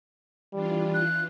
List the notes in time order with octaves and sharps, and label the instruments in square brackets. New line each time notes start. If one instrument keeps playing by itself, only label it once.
[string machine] E3 D4 F4 [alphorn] G3
[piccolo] F#6